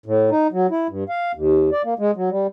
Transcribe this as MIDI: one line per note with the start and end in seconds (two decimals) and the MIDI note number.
0.06 0.30 45
0.30 0.47 63
0.52 0.67 54
0.71 0.87 64
0.89 1.04 43
1.09 1.32 77
1.35 1.70 39
1.72 1.82 74
1.84 1.94 58
1.99 2.11 56
2.16 2.30 54
2.30 2.47 55